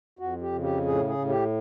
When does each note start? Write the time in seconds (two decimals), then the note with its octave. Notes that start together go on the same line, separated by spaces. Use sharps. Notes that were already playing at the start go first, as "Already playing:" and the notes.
0.19 F2 F#4
0.41 G4
0.52 C#3
0.63 G4
0.85 A2 G#4
1.07 G#4
1.18 A2
1.29 G4